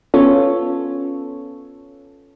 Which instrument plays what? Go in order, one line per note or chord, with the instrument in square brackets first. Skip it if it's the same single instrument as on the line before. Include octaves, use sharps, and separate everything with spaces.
[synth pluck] B3 C#4 F4 A4 C#5